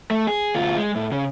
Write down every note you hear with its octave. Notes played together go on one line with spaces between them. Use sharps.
A3
G#4
D2 F4
G#3
A2
C#3